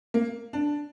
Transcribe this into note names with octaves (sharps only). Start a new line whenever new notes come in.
A#3
D4